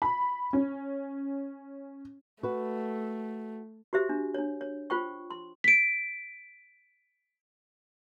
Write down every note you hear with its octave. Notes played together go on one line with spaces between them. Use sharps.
B5
C#4
A3 F#4 B4
F#4 G4 C5 E5
D4
D4 C#5
C#5
F4 C5 G5 C#6
C6
B6 D7